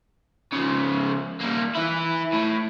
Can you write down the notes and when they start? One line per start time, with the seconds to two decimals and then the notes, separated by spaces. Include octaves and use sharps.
0.53 C#3 F3
1.41 G3 A#3
1.75 E3 E4
2.33 A2